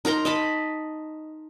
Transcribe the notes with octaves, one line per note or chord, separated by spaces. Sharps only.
D#4 A#4 A#5 C6
D#5 A5 B5